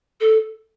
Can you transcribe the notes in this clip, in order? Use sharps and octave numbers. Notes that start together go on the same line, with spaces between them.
A4